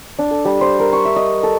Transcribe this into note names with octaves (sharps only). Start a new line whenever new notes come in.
D4
A4
G3
C5
A#4
C#6
E5
D#5
A4